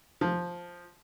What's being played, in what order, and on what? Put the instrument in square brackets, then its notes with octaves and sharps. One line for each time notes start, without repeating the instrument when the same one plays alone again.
[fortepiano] F3